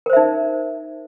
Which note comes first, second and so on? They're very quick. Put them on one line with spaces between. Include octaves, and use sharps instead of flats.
A#4 C5 E5 D#4